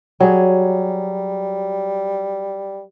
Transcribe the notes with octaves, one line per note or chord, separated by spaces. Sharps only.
F#3 G3 G#4